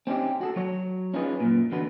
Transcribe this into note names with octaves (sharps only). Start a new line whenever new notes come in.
C4 C#4 D#4 G4
F#4 G#4 A4
F#3 C#5
C#4 D#4 F4 G#4 A4 B4
F#2 A#2
E2 D3 F#4 B4